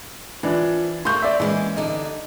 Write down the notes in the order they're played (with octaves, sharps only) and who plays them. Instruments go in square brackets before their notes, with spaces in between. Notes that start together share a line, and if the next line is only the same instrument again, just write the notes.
[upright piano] E3 D4 [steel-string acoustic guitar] F3
[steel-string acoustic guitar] A3 A#3 [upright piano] C6 C#6 G6
[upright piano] D5 E5
[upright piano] E3 [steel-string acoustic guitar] G#3 A#3 C#4
[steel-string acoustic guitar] G2 D3 D#4